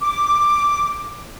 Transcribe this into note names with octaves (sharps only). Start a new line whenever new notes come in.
D6